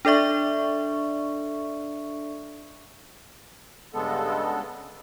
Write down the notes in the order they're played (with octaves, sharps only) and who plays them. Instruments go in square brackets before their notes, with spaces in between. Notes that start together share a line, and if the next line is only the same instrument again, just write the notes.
[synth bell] D4 A4 D5 E5 C#6
[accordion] G2 C#3 G#3 B3 A4